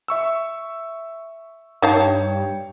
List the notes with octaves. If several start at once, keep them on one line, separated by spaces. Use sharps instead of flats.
E5 C#6 E6
G2 D#4 C#5 F5 G5 A5